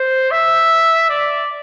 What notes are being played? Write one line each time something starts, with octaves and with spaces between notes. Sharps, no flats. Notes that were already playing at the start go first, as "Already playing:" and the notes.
Already playing: C5
E5
D5